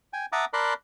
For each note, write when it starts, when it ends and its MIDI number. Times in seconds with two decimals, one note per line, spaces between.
0.13 0.26 79
0.13 0.26 80
0.32 0.45 76
0.32 0.45 78
0.32 0.45 81
0.32 0.45 82
0.32 0.45 86
0.32 0.45 87
0.53 0.74 70
0.53 0.74 74
0.53 0.74 81
0.53 0.74 83
0.53 0.74 84
0.53 0.74 90